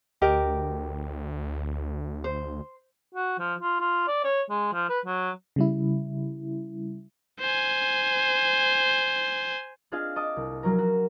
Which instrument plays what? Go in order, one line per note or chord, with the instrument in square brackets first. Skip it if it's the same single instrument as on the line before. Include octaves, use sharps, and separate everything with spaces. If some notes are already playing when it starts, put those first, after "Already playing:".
[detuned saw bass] D2 [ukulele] G4 A#4 D#5
[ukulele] C5
[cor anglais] F#4
F3
F4
F4
D5
C#5
G#3
F3
B4
F#3
[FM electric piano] C#3 G3 E4
[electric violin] C5 G#5
[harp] C4 D4 F4 G#4 D#5 F5
D#5 A5 D6 D#6 D#7
C2
F3 F#3 C#4 A#4
F#4